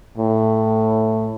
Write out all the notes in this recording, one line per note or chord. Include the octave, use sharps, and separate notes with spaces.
A2